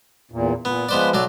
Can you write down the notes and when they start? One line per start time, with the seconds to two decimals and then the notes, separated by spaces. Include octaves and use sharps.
0.31 E2 A#2
0.65 A#2 B3
0.89 F3 G#3 B3 B4 C5 D5
1.14 B1 F#3 D5